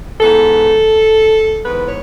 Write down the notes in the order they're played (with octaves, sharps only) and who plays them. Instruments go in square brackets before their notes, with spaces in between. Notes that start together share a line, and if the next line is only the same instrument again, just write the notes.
[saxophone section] G#2 E3 B3 A4
G#2 E3 B3 B4
C#5